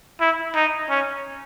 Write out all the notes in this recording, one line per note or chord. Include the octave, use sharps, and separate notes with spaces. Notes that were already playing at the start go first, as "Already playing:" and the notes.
E4
D#4
C#4